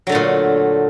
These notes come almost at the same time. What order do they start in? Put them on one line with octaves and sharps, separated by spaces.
F#3 D3 A3 A#2